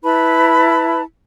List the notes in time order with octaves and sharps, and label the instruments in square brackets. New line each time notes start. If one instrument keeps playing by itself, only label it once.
[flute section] E4 B4 A5 B5